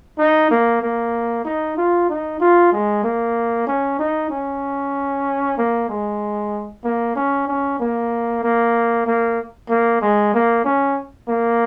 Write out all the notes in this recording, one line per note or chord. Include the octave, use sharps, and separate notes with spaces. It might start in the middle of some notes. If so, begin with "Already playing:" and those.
D#4
A#3
A#3
D#4
F4
D#4
F4
G#3
A#3
C#4
D#4
C#4
A#3
G#3
A#3
C#4
C#4
A#3
A#3
A#3
A#3
G#3
A#3
C#4
A#3